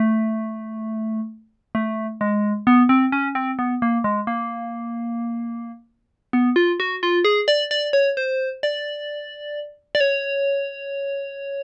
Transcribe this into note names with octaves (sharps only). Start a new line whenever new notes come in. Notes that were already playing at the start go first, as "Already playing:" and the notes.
Already playing: A3
A3
G#3
B3
C4
C#4
C4
B3
A#3
G#3
A#3
B3
F4
F#4
F4
G#4
D5
D5
C#5
C5
D5
D5
C#5